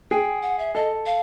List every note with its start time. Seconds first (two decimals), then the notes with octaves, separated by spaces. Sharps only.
0.11 G#4 G5
0.42 F#5
0.59 E5
0.75 A4 D#5
1.06 F5